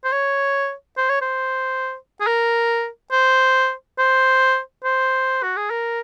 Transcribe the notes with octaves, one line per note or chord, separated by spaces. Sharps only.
C5
C#5
C5
C#5
C5
G#4
A#4
C5
C5
C5
F#4
G#4
A#4